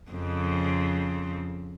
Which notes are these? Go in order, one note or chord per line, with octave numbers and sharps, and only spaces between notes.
F2 C#3 C4